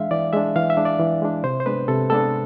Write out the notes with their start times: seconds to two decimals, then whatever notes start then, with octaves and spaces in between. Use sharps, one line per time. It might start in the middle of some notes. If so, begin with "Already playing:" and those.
Already playing: E3 G#3 D4 E5 F5
0.11 E3 D5
0.33 G#3 D4 E5
0.56 E3 F5
0.70 E5
0.77 G#3 D4
0.85 D5
0.99 E3
1.22 G#3 D4
1.43 C3 C5
1.60 C5
1.66 G#3 B3 D4 B4
1.88 C3 A4
2.10 G#3 B3 D4 A4